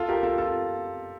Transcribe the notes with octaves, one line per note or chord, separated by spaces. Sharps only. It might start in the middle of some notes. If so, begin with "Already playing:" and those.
Already playing: F4 A4
G4 A#4
F4 A4
F4 A4